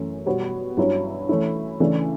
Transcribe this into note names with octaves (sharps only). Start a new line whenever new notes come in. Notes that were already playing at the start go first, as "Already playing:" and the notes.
Already playing: F#2 E3 A3 C#4
B2 G3 B3 F#4 C#5
G2 F#3 C#4 E4
E3 A3 C#4 E4
C#3 E3 A3 D4 A4